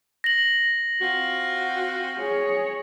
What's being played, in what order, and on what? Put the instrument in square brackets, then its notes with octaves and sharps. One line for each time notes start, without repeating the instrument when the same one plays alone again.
[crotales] A#6 F#7
[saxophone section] C4 F4 F#4
[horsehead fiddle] G#4 C#5